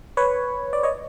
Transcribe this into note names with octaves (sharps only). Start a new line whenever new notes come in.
B4 C#5
D5
C#5 D#5